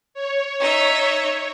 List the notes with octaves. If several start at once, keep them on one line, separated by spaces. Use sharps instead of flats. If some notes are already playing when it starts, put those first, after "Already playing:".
C#5
D#4 E5